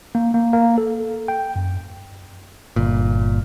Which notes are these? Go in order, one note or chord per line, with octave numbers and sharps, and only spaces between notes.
A#3
A#3
A#3
A4
G5
F#2
G1 A#2